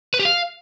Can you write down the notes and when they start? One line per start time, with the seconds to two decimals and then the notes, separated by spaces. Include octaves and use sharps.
0.14 B4
0.19 G4
0.25 F5